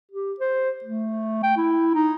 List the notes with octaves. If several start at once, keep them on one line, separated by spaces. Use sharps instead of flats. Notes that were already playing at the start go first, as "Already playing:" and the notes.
G4
C5
A3
G5
E4
D#4